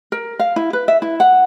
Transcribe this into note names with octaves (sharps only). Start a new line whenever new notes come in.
A#4
F5
E4
B4
E5
E4
F#5